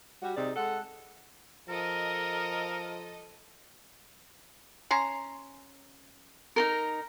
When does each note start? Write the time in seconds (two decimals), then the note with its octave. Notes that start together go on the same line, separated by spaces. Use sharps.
0.23 G3 F#4
0.36 C3 D#4 G#4 D5
0.56 G#3 A4 F#5
1.69 F3 A4 A#4 D#5
4.91 C#4 A#5 C6
6.56 D#4 A4 A#4